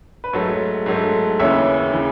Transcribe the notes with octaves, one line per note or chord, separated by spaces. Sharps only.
B4
G#2 F#3 A3 A4 C#5
G#2 F#3 A3
D#2 C#3 E3 C#5 E5
C#3 E3